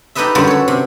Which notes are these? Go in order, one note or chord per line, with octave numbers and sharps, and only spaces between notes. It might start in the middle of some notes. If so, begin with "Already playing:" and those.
D#4 G4 A4 B4 D#5 E5
F#2 D3 G3 F4 F#4
A4 C#5
C3